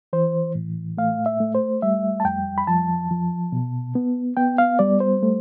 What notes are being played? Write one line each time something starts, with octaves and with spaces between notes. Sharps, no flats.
E3 C5
A2
A3 F5
E5
A3
C5
G3 E5
A5
F2 G5
B5
F3 A5
F3
B2
B3
B3 G5
F5
G3 D5
C5
A3